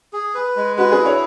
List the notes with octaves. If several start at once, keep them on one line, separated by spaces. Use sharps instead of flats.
G#4
B4
G#3
F#4 B4
G#4
E4
C#5